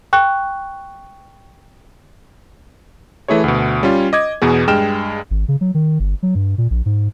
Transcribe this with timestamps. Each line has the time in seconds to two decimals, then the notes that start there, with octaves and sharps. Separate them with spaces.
0.13 G5 C#6 F#6
3.28 E3 A3 E4 G#4 C#5
3.44 D2 B2
3.83 G3 C#4 F4
4.13 D#5 D6 G#6
4.42 E2 B2 B3 G#4
4.67 G2 G#3 G5 F6 E7
5.31 G#1
5.48 C#3
5.61 F#3
5.75 D#3
6.00 G1
6.23 F#3
6.35 G2
6.58 A#2
6.71 A#1
6.86 G#2